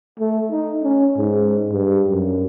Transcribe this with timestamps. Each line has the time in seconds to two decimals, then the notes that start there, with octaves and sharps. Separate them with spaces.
0.20 A3
0.52 D#4
0.83 C#4
1.18 G#2
1.72 G2
2.08 F#2